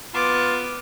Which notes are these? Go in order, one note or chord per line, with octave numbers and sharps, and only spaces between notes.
B3 F4 D6